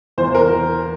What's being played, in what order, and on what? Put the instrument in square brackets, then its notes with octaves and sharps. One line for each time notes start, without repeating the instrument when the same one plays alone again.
[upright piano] E2 C5
A#4